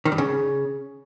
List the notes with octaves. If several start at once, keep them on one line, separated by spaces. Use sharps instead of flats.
D#3
G2
C#3